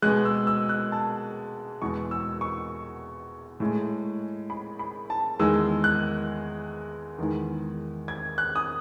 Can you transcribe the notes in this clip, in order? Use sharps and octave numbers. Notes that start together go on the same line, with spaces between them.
B2 G#3 F#6
E6
E6
F#6
A5
E2 B2 G#3 C#6
E6
C#6
A2 G#3
B5
B5
A5
E2 D#3 G#3 E6
F#6
E2 D#3 G#3
G#6
F#6
D#6